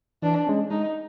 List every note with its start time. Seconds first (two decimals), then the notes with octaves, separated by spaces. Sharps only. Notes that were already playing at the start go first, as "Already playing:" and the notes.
0.22 E3 D4
0.47 G#3 C#4
0.71 G#3 D#4